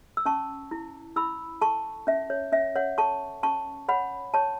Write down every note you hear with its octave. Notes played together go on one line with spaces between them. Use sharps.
E6
C#4 A5 C#6
E4
E4 B5 E6
A4 A5 C#6
C#4 E5
C#5
C#4 E5
C#5 F#5
A4 A5 C#6
C#4 A5 C#6
C#5 F#5 B5
C#5 A5 C#6